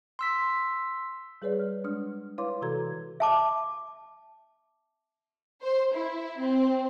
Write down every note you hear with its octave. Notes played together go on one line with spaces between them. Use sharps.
C6 E6 B6
G3 G#4 B4 C#5 D5
F6
G#3 D4 D#6 F6
E4 B4 C#5 F5 C6 D6
C3 E3 F#4 A4 A#5 G#6
E5 A5 D6
C5
E4
C4